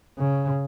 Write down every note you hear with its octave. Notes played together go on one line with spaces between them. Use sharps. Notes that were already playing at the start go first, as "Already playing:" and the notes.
C#3